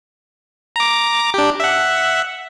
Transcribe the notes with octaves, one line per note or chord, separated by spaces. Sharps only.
A#5 D6
D4 G4
E5 F#5